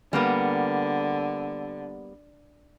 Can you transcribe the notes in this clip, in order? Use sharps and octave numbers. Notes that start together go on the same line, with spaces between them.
D3 G3 A#3 B3